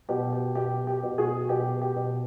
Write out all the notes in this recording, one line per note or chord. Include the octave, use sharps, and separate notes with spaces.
B2 G4
G4
B2 G4
G4
B2
F#4 G#4
B2 G4
G4
B2